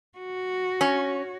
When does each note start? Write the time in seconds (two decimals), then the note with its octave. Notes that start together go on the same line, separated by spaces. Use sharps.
0.18 F#4
0.81 C#4